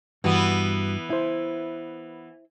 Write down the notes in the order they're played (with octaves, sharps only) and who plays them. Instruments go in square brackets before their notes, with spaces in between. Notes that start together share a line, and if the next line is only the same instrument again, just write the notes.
[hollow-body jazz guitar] G2 F#4 [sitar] E3 B3
[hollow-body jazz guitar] E4 C5